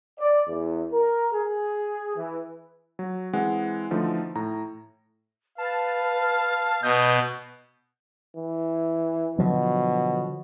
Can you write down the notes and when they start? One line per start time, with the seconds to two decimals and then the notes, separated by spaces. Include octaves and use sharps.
0.19 D5
0.49 E2
0.92 A#4
1.33 G#4
2.17 E3
2.99 F#3
3.33 E3 G#3 C4 F#5
3.91 D3 E3 F3 A3 D#4
4.35 A2 A#5
5.58 B4 F5 A5
6.83 B2 B3 D#5 G6
8.37 E3
9.39 B2 D3 F3 F#3